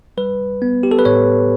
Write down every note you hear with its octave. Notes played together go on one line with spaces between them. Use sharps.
G3 B4
B3
G4
A4
B4
A2 C#5